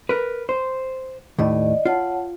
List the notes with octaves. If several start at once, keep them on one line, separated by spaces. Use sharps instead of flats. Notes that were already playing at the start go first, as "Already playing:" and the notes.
A#4 B4
C5
D#2 A2 D5 D#5
F4 C#5 F#5 A5